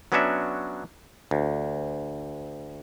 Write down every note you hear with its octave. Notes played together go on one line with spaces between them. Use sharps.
F#3 B3 C#4 D4 F#4 E5
D2